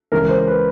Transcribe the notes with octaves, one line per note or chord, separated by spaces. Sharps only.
C#2 C#3 E3 A#4
C5
B4